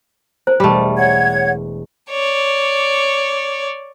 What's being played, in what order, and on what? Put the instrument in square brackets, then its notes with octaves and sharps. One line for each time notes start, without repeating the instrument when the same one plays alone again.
[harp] A#4 [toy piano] C5
[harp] E1 F6 [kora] G3 A3
[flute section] C#5 F#5 G#6
[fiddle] C#5 D5